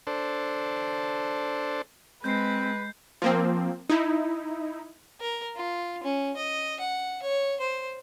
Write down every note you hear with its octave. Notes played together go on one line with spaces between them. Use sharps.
D4 A4 C5
G#3 C4 B4 G6 C7
F3 A#3 C4
D#4 E4
A#4
F4
C#4
D#5
F#5
C#5
C5